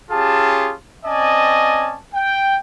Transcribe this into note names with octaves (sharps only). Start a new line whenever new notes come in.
C#4 F4 G4 G#4 A5
C4 C#4 D5 D#5 G#5 A5
G5